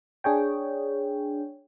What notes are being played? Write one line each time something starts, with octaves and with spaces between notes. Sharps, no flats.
D4 G#4 C#5 G5